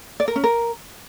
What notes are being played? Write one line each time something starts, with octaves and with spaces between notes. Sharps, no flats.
D5
A#4
C#4
A#4